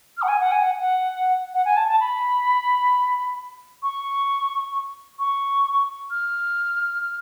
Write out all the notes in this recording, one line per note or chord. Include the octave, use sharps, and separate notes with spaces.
F6
F#5
G#5
F#5
G#5
F#5
F#5
F#5
G#5
A5
A5
B5
C#6
C#6
F6